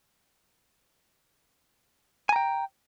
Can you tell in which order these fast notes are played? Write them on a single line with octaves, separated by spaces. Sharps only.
G#5 A#5 G5